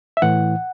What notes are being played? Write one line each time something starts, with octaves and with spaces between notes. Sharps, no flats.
E5
A2 E3 F#5